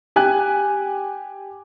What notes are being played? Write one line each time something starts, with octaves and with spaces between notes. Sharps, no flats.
G4 G#5 F#6